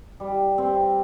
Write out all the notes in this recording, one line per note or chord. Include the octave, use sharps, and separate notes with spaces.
G3
C4